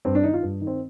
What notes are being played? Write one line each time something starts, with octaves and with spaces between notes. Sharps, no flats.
G2 C4
D4
D#3 D#4
F4
G2
D#3
C4